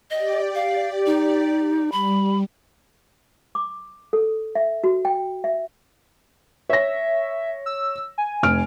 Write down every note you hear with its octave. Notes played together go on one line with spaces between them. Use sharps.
G4 D5 D#5
F5
D#4
G3 B5
D6
A4
E5
F#4
G5
E5
C#5 E5 A#6
E6
G#5
F1 F6 D7